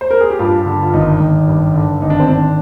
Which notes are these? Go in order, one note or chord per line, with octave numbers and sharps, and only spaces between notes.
C5
A#4
G#4
G4
G2 F4
D3
F4
G#1 D#4
G#1
G2
D3
G#1 D#4
D4
C4
G#1 D4